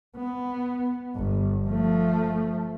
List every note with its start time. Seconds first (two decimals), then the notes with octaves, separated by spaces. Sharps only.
0.16 B3
1.15 G1
1.67 F3 A3